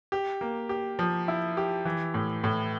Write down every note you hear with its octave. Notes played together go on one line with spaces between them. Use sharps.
G4
A#3
G4
F3
E4
G4
E3
A2
A2